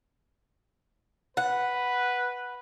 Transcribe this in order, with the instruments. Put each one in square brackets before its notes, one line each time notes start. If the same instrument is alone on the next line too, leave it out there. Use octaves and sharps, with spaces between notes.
[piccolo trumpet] B4 [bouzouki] F#5